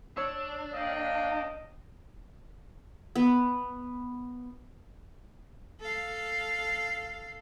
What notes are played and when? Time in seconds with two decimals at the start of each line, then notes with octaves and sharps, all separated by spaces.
0.17 D4 C#5 E6
0.74 A#3 D#5 F5 G5
3.16 B3
5.81 A4 F5